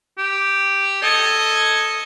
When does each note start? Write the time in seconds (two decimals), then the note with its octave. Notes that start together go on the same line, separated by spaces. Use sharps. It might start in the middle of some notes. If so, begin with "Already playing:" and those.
0.18 G4
1.02 A4 D#5 G#6